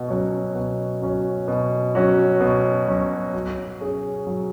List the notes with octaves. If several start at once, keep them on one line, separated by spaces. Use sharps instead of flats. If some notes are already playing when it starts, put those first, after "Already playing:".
Already playing: B2
F#3 C#4 F#4
B2
F#3 C#4 F#4
B2
F#3 C#4 F#4
B2
F#3 C#4 F#4
F#3
C#4 G#4
F#3